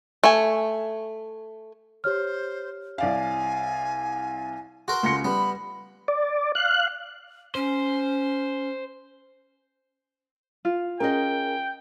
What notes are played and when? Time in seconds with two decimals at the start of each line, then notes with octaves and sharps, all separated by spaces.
0.24 A3 G#5
2.04 G4 C5 C#5 F6
2.98 C2 D5 F5 G#5
4.88 F#4 A#4 C6
5.03 C#2 A#6 C#7
5.25 G3 B3 B5
6.08 D5
6.55 F5 F#6
7.55 C#4 C5
10.65 F4
11.00 C#4 G#4 A#4 D#5 G5